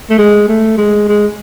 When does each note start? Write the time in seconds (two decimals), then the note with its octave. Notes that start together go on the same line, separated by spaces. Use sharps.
0.10 A3
0.18 G#3
0.48 A3
0.77 G#3
1.08 G#3